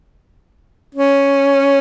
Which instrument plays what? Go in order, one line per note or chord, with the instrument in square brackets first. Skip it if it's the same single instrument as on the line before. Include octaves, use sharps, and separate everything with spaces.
[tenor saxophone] C#4